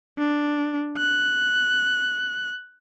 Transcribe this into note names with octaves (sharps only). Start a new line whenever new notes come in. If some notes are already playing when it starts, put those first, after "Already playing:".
D4
F#6